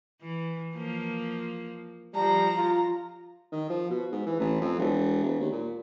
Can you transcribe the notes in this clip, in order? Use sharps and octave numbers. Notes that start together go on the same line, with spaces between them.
E3
F3 A#3
F3 G3 A#5
F4
D#3
F3
B2
G#2
E3
A1
F2
E1
E1
D#2
A#2